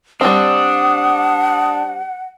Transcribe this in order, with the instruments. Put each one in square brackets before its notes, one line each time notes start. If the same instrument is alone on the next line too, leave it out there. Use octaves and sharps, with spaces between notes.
[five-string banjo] G3 C4 [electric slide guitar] D4 [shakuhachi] F#5 [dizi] D#6